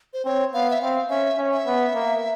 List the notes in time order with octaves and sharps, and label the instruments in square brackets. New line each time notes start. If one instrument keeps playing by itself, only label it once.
[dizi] C5
[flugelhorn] C4 [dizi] C#5
[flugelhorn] B3 [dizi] F5
[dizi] E5
[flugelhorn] C4 [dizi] F5
[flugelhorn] C#4 [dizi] E5
[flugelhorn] C#4
[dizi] E5
[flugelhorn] B3
A#3